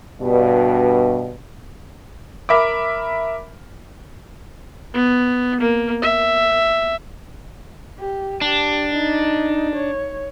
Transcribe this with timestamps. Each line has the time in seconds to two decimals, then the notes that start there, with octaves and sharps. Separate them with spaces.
0.21 G2 B2
2.49 A#4 E5 B5 D6
4.94 B3
5.60 A#3
6.02 E5
7.99 G4
8.41 D4 G4
8.94 D#4
9.76 C#5